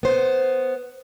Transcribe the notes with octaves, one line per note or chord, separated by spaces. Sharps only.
B3 C5